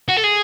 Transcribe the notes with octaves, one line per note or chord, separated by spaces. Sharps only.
F#4
A4
G#4